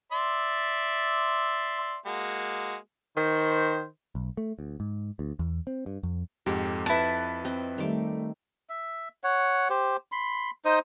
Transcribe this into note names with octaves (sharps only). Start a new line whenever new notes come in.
D5 E5 C6
G#3 A#3 F#4
D#3 C5
B1
A3
D2
G#2
D2
E2
C4
G2
F2
F2 G#2 G4 A4
F2 E4 B4 A5
C4 D#5
D#3 G3 A3 D6
E5
C#5 F#5
G4 C5
B5 C6
D#4 C5 D#5 D#6